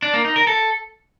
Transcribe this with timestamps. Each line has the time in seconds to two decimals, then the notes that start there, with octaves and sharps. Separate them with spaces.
0.02 D4
0.14 A#3
0.25 D#4
0.36 A#4
0.47 A4